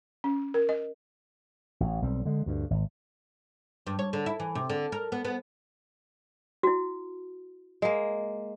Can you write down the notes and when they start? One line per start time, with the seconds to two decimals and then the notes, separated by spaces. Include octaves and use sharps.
0.24 C#4
0.54 A#4
0.69 D#5
1.80 A1
2.02 B1 G3 C4
2.25 D3 G#3
2.46 D2 G2
2.71 G#1
3.87 G2
3.99 C#5
4.13 D3
4.26 E4
4.40 E3
4.55 C3
4.70 D3
4.92 A#4
5.12 B3
5.25 B3
6.63 E4 F#4
7.82 G#3 A#3